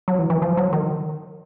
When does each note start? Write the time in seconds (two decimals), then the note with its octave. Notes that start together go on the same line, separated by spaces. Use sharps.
0.08 F#3
0.19 E3
0.30 E3
0.42 F3
0.57 F#3
0.73 D#3